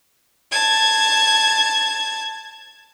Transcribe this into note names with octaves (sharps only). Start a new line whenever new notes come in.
A5 G#6